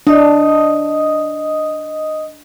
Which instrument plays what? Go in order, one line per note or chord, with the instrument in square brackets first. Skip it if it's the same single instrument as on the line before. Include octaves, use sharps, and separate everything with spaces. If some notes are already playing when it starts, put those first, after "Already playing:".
[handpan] D4 [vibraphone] D#5 D#6